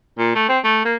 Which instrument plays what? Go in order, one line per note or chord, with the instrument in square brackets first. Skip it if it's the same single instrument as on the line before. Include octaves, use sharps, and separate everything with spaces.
[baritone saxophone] A#2
A3
C4
A3
A#3